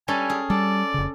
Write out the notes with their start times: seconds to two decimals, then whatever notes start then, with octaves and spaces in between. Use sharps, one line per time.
0.08 G3 C#4 A4 G#5
0.30 G#4
0.50 G3 A4 D5
0.94 F1 C#3